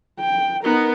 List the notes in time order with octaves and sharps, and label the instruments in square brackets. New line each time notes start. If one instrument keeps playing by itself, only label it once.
[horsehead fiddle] G5
[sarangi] B3 [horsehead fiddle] D#4 A#4